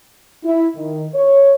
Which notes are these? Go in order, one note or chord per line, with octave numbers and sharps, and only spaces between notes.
E4
D#3
C#5